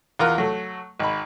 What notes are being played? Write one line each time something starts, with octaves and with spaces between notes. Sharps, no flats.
E2 F4 A#4 F#6
F#3 A3
G#1 B5